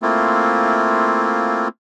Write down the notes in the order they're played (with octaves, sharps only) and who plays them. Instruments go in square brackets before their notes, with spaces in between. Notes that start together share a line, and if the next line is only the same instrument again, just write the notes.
[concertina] A3 A#3 C4 E4 F4